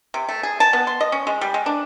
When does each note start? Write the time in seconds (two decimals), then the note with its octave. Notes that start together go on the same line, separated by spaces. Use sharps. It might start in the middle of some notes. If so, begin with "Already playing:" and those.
0.14 C3
0.29 A3
0.43 G#4
0.60 A5
0.73 B3
0.87 C6
1.00 D#5
1.12 C#4
1.27 G#3
1.41 G3
1.54 G#3
1.66 D4